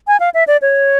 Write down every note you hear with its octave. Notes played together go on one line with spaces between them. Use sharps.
G#5
F5
E5
D5
C#5